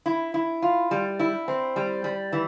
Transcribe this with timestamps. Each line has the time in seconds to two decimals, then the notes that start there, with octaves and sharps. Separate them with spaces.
0.06 E4
0.34 E4
0.62 F4
0.91 G3
1.19 E4
1.48 C4
1.76 G3
2.04 G3
2.33 E3